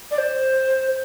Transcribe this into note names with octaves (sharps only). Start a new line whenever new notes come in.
D5
C5